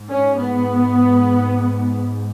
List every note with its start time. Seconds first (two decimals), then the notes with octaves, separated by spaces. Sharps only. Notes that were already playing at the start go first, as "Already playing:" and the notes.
Already playing: G#2
0.10 C#4
0.40 B3